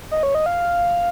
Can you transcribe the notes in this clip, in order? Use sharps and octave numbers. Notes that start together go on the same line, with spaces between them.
D#5
C#5
D#5
F5